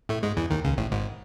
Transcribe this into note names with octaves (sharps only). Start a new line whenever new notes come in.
A2 A3
G#2 G#3
E2 E3
D#2 D#3
C#2 C#3
A1 A2
G#1 G#2